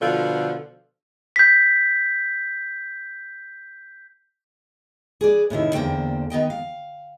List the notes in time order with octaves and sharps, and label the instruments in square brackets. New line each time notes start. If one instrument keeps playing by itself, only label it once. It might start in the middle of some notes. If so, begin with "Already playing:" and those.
[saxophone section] B2 D3 F3
[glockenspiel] G6 B6
[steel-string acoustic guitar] G#4 B4 D5
A2 C3 D#3 E4
E2 D3 A#3 C5 G5
D#3 B3 D#5 G5
F5